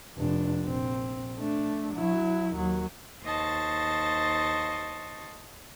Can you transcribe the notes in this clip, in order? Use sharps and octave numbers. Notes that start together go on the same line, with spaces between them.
F1 D4
A#1 C4
A3 D4
F#3 E4
D#2 F#3
D#2 C5 D#5 A5 C#6